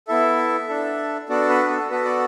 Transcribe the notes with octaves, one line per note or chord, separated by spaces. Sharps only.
B3 E4 A4 E5
D4 A4
B3 D4 F#4 A4 D5
B4
A4
B3 F#4 A4 B4
D5